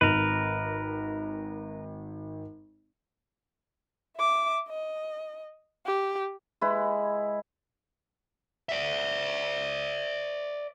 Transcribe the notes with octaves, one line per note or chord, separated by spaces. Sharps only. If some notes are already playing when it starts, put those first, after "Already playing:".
G#1 A#4 B4
E5 D6
D#5
G4
G#3 E4 B4
D5 E5